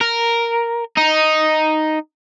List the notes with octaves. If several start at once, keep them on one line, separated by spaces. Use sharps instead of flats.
A#4
D#4